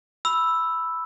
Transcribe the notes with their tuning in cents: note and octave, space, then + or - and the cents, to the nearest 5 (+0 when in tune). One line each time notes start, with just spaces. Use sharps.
B5 +0 E6 +0